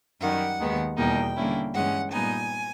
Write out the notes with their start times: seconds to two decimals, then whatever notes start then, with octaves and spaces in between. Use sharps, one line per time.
0.20 F#2 D#3 G3 F#5
0.60 D#2 D#3 G#3 B3
0.97 E2 B2 G3 A#3 D#4 G5
1.36 D3 G3 A#3 C#4 E4
1.74 G2 E3 G#3 C#4 F#5
2.12 A#2 G3 B3 D#4 G#5